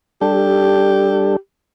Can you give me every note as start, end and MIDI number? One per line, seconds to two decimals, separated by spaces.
0.22 1.36 55
0.22 1.36 62
0.22 1.36 67
0.22 1.36 69